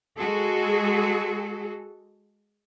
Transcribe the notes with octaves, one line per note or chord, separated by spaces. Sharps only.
G#3 F#4 G#4 A4